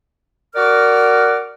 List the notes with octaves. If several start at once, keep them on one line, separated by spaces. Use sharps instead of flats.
F#4 A#4 D5 F#5 D6 F6